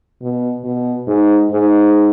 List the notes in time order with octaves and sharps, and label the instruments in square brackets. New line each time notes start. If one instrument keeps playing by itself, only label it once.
[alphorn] B2
B2
G#2
G#2